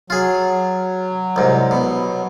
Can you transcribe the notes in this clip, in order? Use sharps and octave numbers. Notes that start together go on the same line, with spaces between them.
F#3 F4 G#4
C2 G#2
B2